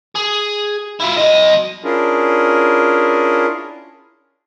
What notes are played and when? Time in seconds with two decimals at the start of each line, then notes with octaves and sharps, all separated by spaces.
0.16 G#4
1.00 E4 F4
1.17 F#3 D#5
1.84 C#4 D4 E4 F4 G#4 A#4